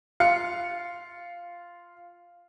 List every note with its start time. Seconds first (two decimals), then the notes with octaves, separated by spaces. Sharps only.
0.20 F4 F5 C#7